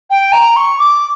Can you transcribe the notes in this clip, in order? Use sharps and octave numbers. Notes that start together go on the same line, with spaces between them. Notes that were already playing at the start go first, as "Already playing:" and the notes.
G5
A#5
C#6
D6